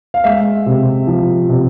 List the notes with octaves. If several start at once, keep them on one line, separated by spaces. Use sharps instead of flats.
F5
G#3 E5
C3
F3
C3